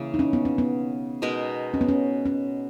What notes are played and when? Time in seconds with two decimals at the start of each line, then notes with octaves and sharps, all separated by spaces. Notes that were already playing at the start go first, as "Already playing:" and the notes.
Already playing: C#3 E3 A#3
0.14 D#4
0.19 C#4
0.33 B3
0.45 C#4
0.58 B3
1.22 B2 G#3 D#4 A#4
1.74 C#4
1.81 B3
1.89 C#4
2.26 C#4